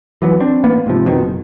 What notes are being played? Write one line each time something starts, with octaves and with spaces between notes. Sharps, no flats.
E3 F#3 A3 B3
C4 D4
A1 A#3 B3
G#2 C3 F3
F2 B2 D#3
F#1